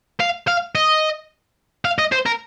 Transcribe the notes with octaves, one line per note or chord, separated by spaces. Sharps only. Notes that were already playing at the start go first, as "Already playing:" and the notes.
F5
F5
D#5
F5
D#5
C5
A#4